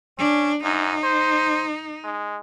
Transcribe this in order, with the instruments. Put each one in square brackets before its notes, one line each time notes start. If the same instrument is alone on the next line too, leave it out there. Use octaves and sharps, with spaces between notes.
[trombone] C#4 [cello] D4
[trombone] F#2 [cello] D#4
[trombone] C5
G#3